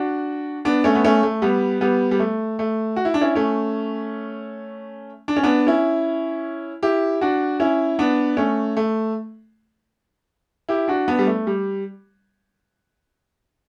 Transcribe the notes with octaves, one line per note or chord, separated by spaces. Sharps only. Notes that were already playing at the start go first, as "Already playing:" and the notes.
Already playing: D4 F#4
B3 D4
A3 C#4
B3
A3 C#4
A3
G3 B3
G3 B3
G3
A3
A3
F#4
E4
D4
C#4 E4
A3 C#4
D4
C#4
B3 D4
C#4 E4
E4 G4
D4 F#4
C#4 E4
B3 D4
A3 C#4
A3
E4 G4
D4 F#4
B3 D4
G3
A3
G3